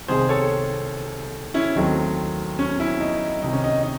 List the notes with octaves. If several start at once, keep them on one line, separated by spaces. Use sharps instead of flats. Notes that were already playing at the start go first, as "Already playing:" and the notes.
C2 C3 D#3 G#4 C5
A4 C#5
C#4 E4
D#2 D#3 F#3 A3 C4
C#4
C#4 E4
D#4
C2 C3 D#3 D#4
C#4
D#4
D#4